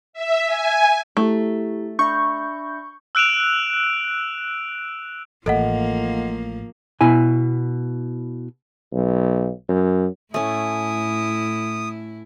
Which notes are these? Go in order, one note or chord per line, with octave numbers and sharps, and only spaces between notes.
E5
G#5
A3 E4 G4
D4 E5 B5 C#6 G6
E6 F#6 D7 E7 F7
A1 A2 F3 A#3 A4 D#5 F#5
B2 E4 G#5
B1
F#2
A2 A3 C#4 E4 D#6